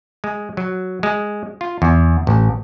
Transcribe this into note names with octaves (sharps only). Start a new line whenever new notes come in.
G#3
F#3
G#3
F4
E2
A1